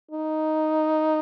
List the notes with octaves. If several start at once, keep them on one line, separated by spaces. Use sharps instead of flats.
D#4